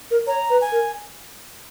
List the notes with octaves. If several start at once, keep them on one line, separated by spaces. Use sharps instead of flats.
A#4
C#5 A#5
B4
G#5
A#4